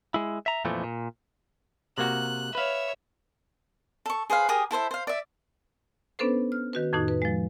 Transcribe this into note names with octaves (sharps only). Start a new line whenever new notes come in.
G#3 E4
E5 A#5
F2 A#2 E3 F3 A3
A#2
C3 A#3 F#4 F#6
B4 C#5 E5 F5
A4 C#6
G#4 B4 C5 F5
G4 G#4 A#4 D#6
E4 A4 C5 E5
C5 F5
D5 E5
B3 C#4 D4 A4 B4 C5
F6
D#3 F#4 B4
F2 A2 D#3 D#4 F#4
B4
F3 G#3